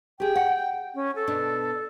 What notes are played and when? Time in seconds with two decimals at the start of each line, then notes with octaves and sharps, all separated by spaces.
0.20 G4 G#4 G5
0.35 F#5
0.95 C#4
1.16 A4
1.27 B2 D4